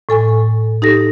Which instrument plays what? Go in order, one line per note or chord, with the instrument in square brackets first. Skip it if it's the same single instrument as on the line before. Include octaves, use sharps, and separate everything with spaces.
[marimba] A2 A4 G#5 C#6
D#4 G4 A4 A#6